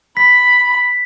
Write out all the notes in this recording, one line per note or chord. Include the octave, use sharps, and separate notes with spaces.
B5 B6